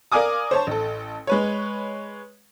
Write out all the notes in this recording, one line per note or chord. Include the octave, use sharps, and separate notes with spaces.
A#4 D5 F5 G#5 D6 D#6
C5 C#5 A5
A1 A4
G#3 B4 C#5